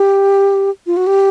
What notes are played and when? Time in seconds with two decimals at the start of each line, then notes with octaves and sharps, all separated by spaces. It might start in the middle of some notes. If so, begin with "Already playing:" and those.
Already playing: G4
0.87 F4
0.97 F#4
1.07 G4